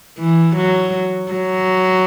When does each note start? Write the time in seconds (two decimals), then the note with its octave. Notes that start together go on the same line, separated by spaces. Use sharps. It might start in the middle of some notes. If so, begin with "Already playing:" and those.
0.19 E3
0.56 F#3
1.32 F#3